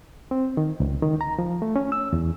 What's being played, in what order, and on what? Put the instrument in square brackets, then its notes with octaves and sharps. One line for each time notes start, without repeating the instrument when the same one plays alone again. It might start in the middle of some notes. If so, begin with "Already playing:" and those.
[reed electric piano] C4
D#3
C#2
D#3
A#5
F3
A3
C#4
E6
E2